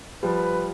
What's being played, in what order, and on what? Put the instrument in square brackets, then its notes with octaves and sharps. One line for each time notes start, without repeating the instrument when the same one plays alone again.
[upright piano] F3 G3 [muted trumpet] B4